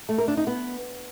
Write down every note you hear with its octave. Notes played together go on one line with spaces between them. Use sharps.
A3
A#4
D4
D#4
B3